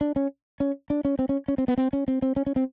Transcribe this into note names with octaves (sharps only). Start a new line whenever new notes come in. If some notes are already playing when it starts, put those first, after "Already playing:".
D4
C#4
C#4
D4
C#4
C4
C#4
C#4
C4
B3
C4
C#4
C4
C4
C#4
C#4
C4